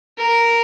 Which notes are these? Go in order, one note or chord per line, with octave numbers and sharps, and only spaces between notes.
A#4